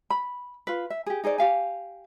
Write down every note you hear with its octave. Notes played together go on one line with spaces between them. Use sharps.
B5
F4 B4
E5
G4 G#4
D#4 G#4 C5 D5
G4 F5 G#5